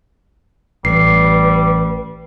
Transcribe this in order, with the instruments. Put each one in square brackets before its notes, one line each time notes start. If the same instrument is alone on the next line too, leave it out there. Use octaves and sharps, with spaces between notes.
[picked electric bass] A1 [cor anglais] G3 [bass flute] B4 [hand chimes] C7